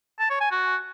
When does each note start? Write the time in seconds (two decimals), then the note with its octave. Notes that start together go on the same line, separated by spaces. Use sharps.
0.19 A5
0.30 C#5
0.41 G#5
0.51 F#4